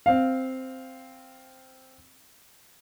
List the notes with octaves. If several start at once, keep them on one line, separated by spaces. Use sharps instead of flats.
C4 F5